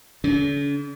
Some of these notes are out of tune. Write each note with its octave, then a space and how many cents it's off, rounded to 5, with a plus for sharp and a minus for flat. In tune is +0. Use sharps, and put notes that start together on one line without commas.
D3 -45 C#4 +45